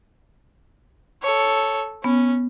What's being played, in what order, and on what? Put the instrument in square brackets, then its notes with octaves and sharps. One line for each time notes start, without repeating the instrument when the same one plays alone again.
[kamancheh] A4 C#5
[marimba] B3 [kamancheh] C#4